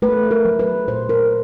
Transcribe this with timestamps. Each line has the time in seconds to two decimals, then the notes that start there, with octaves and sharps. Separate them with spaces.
0.02 A3 B4
0.31 A#4
0.45 F#3
0.59 B4
0.88 A#2 C5
1.09 A#4